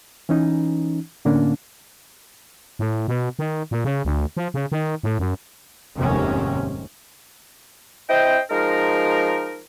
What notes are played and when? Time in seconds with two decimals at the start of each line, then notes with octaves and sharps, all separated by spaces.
0.29 E3 C#4 D#4
1.25 A2 D3 A#3 C#4 D4
2.79 A2
3.08 B2
3.39 D#3
3.71 A#2
3.85 C#3
4.05 D2
4.37 F3
4.54 C#3
4.72 D#3
5.03 A2
5.19 F#2
5.95 F1 D#2 G#2 C3 D#3 C#4
8.10 C4 E4 C5 D#5 G5
8.51 F3 G#3 D#4 A#4